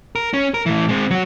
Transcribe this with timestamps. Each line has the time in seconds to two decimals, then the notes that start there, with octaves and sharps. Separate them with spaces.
0.15 A#4
0.33 C#4
0.54 A#4
0.66 A2 E3
0.89 G#3 C4
1.11 F#3 F#4